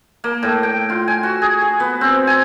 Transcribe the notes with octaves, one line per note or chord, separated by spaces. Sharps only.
A#3
A2
G5
F4
G#5
F#4
G#4
G#4
B3
C4
G#5